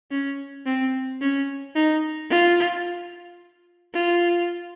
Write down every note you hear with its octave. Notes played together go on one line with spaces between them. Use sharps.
C#4
C4
C#4
D#4
F4
F4